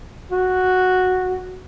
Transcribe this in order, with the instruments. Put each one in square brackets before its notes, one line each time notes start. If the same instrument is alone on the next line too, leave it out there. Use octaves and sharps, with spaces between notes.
[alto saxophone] F#4